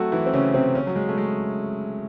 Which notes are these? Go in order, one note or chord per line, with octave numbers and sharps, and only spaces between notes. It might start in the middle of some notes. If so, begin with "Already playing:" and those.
Already playing: F#3 A3 C4 F#4 A4 C5
E3 E4
C4
C#3 C#4
C3 C4
C#3 C#4
F#3
G#3
A3
G#3